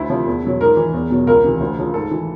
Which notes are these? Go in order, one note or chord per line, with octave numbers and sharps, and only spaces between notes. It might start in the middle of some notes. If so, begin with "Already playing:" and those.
Already playing: D2 E4
C3 F3
E2
B2 F#3
G#2 A#4
E3
E2
B2 F#3
C#2 A#4
C3 E3
D2
C#3 F3
G#2 A4
E3